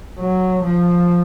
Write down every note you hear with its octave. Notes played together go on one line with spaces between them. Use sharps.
F#3
F3